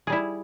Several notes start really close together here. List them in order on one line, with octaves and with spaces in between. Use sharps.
G#4 G3 E4